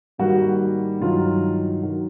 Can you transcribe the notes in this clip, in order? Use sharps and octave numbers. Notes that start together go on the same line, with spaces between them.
G#2 D#3 G3 A#3 F#4
G2 D#3 F#3 F4
D#3 F#3